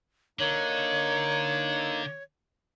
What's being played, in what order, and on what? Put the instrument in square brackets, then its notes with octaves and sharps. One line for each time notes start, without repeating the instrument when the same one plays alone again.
[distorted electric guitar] D3 [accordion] A#3 D#4 [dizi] C#5